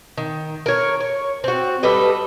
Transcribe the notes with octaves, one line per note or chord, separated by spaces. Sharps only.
D#3
A#4 C#5
C#5
C4 F#4
G3 A4 B4 D#5